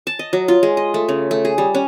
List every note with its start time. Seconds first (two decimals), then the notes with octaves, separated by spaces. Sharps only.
0.07 A5
0.19 D#5
0.33 F#3
0.48 F4
0.63 G#3
0.77 D#5
0.94 A3
1.09 C#3
1.31 A3
1.45 G#4
1.58 G3
1.74 C#4